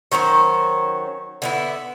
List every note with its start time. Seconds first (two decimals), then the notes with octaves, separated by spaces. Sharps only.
0.12 D#3 F#3 C#4 C5
1.42 D3 B3 E4